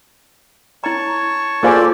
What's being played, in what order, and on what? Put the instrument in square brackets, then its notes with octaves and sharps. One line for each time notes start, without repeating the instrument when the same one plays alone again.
[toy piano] E4 A#5 [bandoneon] C#5 A5 C#6
[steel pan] A#3 F4 C5 [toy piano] G#4 F5 G#5 [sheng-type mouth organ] A4 D5